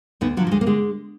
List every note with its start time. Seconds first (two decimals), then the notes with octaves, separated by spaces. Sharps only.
0.21 D2 B3 D#4
0.37 D3 F3 F#3
0.47 F#3
0.51 D2 G#3
0.61 A#3
0.66 D3 G#3